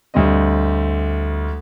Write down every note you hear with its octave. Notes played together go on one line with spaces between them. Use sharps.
D2 G2 G3 C4 D#5